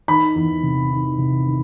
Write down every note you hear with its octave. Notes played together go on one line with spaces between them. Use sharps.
D#3 B5
E2
C3
D#3
C3
D#3